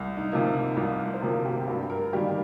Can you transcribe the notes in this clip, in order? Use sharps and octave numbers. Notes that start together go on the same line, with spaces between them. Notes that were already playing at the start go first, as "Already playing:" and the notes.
Already playing: C2
D#4
C3 F3 A#3
D#4
C2 F4
C5
C3 F3 A#3 A#4
G4
G2 G4
A#4
D#3 G3 A#3 G4